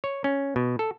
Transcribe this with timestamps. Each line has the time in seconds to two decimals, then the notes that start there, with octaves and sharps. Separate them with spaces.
0.04 C#5
0.24 C#4
0.56 B2
0.79 A4